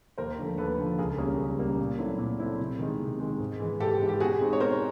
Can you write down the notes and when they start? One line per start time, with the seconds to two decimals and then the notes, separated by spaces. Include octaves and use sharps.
0.17 D#2 A#4 C5
0.38 D3 F3 A3
0.58 D#2 A4 B4
0.78 D3 F3 A3
0.99 C#2 G#4 A#4
1.18 B2 G3 A#3 C#4 G#4 A#4
1.38 C#2
1.59 B2 G3 A#3 C#4
1.79 A#2
1.99 F#3 A3 C4 E4
2.19 A#2
2.40 F#3 A3 C4 E4
2.60 C3
2.79 D#3 G#3
3.00 C3
3.20 D#3 G#3
3.40 G#2
3.60 E3 G#3
3.80 G#2 G4 A4
4.01 E3 G#3
4.09 G4
4.20 B2 F#4 G#4
4.40 G#3 C4 D#4
4.53 C#5
4.60 B2 A#4 C5